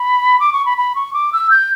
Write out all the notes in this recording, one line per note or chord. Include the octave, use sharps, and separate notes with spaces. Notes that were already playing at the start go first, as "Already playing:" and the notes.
Already playing: B5
D6
C#6
B5
B5
C#6
D6
E6
G6